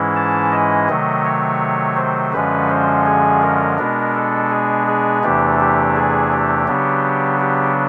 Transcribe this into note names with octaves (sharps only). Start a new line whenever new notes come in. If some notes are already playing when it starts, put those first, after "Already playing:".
Already playing: G#2 E3 G#3 C#4 E4
A5
D#5
C3 D#3 F#3 A3
C#5
C5
F#2 D3 F3 G#3 C#4 B4
C5
G#4
A#4
B2 G#3 B3 D4
A4
G#4
G#4
E2 C3 E3 A3 D4 G4
G4
G#4
G4
C#3 F#3 B3 D4
G4